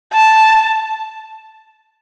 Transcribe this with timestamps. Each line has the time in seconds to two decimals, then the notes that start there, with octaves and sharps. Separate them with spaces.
0.13 A5